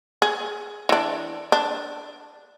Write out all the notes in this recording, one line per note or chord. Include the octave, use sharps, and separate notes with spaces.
G#4
E3 D4
D4